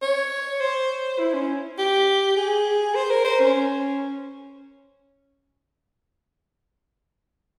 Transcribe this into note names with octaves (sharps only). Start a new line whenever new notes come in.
C#5
C5
E4
C#4
G4
G#4
C5
A#4
C5
C#4